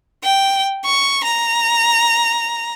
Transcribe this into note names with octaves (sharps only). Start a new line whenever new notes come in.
G5
C#6
A#5